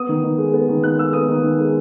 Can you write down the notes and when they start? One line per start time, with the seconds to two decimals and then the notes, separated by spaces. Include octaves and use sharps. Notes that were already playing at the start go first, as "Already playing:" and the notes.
Already playing: B3 D#6
0.09 D#3
0.24 D#3
0.38 G#3
0.54 B3
0.69 D#3
0.83 D#3 F#6
0.98 G#3 E6
1.13 B3 D#6
1.29 D#3
1.43 D#3
1.59 G#3